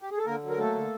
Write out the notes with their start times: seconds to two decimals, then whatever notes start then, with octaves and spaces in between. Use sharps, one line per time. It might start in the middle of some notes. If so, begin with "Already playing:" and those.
0.02 G4
0.11 G#4
0.18 A4
0.26 D3 A#3 A#4
0.42 F#3
0.49 A#4
0.58 A3 A#3 A4
0.75 D3